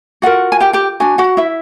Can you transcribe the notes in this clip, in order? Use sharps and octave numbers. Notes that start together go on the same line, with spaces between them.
F4 F#4 A#4 F#5
G#5
G4 G5
G4 G5
D4 F#4 G#5
F#4 F#5
E4 E5